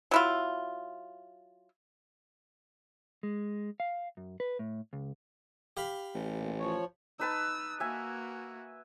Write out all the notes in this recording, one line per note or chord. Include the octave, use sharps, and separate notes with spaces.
F#3 E4 F4
G#3
F5
F#2
B4
A2
C#2
G4 F5 B5
A1
A#2
F3 C#5
D#4 B4 A5 E6
A#3 F#4 E5 G#5